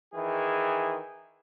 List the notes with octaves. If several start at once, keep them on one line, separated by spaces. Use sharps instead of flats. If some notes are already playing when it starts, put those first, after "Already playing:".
D#3 E3 G#4